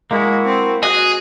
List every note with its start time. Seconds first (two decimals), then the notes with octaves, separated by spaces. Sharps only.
0.11 G#3 A#3 E4 F#4
0.45 C4
0.83 F#4 G#4 D#5 D#6 F#6